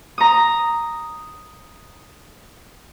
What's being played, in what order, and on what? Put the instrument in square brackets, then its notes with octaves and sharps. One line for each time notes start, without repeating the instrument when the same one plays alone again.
[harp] A#5 D#6